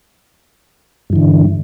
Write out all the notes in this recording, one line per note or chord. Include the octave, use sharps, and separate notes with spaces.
G2 D3 E3